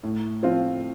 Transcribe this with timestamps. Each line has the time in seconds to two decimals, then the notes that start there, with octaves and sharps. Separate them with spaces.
0.03 A2
0.43 F3 C4 F4